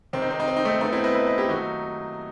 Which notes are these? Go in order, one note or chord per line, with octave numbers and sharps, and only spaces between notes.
C2 C3 D#3 C4
D#4
C4
D#4
C4
D#4
A3 C4
F#2 D#3 A3 B3 D#4
C4 E4
B4 D#5
B4 D#5
B4 D#5
E4 G4
D#2 D#3 F#3 A3 D#4 F#4